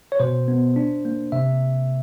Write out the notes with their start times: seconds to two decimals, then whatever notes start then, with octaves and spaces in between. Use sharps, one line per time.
0.12 C#5
0.19 B2 C5
0.48 B3
0.76 D4
1.05 A#3
1.32 C3 E5